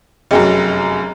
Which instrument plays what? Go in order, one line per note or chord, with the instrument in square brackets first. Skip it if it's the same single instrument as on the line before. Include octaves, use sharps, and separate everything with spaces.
[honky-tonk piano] F1 F#2 F#3 [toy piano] G#4 D#5 G5